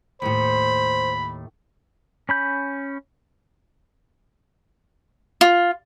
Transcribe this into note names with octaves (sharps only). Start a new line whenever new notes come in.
D#2 A2 C5 B5
C#4 B5 G6
F4